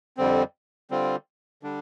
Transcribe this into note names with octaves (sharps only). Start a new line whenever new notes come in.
F2 D3 G3 C4
D3 G3 C4 F4
D3 G3 D4